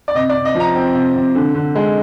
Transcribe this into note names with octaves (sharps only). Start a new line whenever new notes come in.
D5
C3 D#5
D5
C3
D#5
F3
A#5
C4
C3
C3
D3
D3
G#3